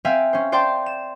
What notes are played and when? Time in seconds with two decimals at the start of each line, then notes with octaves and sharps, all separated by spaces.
0.05 C4 E5 F5 G5 G#5
0.33 C#4 C5
0.52 C5 D5 G5 A5 C6
0.86 E7